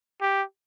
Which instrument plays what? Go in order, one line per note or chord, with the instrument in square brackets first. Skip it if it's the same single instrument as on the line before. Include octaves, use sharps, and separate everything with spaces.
[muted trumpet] G4